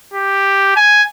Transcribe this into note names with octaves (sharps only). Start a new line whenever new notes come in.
G4
G#5